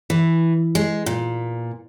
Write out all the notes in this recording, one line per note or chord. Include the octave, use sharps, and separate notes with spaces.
E3
G#3
A#2